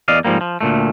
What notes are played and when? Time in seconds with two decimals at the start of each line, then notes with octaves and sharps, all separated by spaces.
0.08 E2 D5 D#5 F5
0.25 G#2 F3 G3 A#3
0.41 F3
0.61 D2 A#2 A3